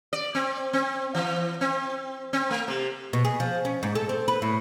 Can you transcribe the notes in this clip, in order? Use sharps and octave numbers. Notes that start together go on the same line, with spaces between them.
D5
C4
C4
E3
C4
C4
A3
C3
B2
G#4
F3
C#4
G#2
A4
C4
B4
A2